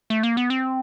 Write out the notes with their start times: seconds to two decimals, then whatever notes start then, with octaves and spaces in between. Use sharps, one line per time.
0.10 A3
0.23 A#3
0.37 B3
0.50 C4